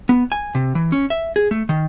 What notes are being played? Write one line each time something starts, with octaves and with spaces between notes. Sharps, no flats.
B3
G#5
C3
E3
C#4
E5
G#4
A3
D#3